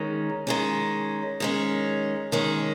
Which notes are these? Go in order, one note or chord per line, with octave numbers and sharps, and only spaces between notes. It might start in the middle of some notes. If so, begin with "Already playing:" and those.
Already playing: D#3 G#3 C#4
D#3 G#3 C#4
D#3 G#3 C#4
D#3 G#3 C#4